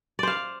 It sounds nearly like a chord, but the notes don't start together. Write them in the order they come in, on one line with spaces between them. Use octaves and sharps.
D5 C5 F5